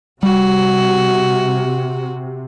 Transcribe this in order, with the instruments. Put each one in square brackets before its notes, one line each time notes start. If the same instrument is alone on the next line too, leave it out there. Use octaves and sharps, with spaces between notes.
[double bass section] C3 [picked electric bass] G3 [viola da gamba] F#4